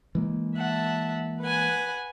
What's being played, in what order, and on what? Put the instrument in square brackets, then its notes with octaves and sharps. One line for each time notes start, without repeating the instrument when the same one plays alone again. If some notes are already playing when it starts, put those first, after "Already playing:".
[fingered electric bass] E3 G#3 A#3
[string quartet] E5 F#5 A5
B4 F#5 G#5